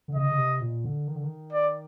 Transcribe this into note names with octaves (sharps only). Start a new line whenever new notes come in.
D3
C#3 D#5
C#3
C3
A#2
D3
D#3
D3
D#3
D5